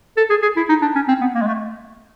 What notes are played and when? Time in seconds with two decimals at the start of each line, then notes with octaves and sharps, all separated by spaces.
0.17 A4
0.30 G#4
0.42 G#4
0.56 E4
0.69 D#4
0.82 D4
0.95 C#4
1.08 C4
1.21 B3
1.35 A#3
1.42 G#3
1.47 A3